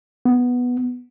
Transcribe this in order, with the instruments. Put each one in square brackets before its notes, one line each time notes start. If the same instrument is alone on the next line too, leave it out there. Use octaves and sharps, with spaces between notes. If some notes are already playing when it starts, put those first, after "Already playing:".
[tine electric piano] B3